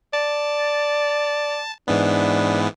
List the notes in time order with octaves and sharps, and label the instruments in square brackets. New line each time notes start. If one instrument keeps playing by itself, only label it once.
[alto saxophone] D5 [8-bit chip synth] A5
[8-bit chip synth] G#2 E3 B3 [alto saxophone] D4